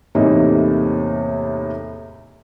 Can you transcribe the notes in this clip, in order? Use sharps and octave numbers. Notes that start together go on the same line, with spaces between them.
E2 A2 C3 G3 A#3 D#4